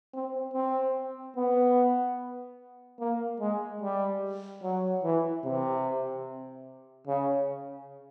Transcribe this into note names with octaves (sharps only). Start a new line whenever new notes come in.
C4
C4
B3
A#3
G#3
G3
F#3
E3
C3
C#3